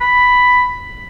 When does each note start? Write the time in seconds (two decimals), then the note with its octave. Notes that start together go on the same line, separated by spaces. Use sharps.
0.01 B5